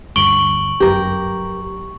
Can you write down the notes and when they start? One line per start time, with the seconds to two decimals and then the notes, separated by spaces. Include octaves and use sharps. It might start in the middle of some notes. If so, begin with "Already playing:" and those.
0.16 D2 G2 C#6 D7 F#7
0.80 G1 F#2 G4 A#4